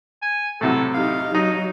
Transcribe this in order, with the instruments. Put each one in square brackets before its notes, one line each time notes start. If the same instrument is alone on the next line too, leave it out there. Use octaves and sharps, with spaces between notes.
[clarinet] G#5
[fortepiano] A2 C3 F#3 [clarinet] A4
[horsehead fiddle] D#4 G4 [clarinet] F5
[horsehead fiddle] F#3 [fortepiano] D#4 [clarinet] D#5